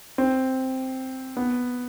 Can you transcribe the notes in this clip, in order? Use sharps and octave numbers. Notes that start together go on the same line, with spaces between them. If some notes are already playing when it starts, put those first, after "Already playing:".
C4
B3